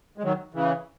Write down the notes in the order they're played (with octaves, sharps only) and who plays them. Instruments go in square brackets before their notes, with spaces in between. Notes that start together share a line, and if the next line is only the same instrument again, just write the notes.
[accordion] G#3
D#3 F#3
C#3 E3